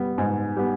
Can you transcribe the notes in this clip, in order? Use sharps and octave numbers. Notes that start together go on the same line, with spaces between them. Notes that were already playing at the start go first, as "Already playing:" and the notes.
Already playing: G3 B3
G#2
G3 B3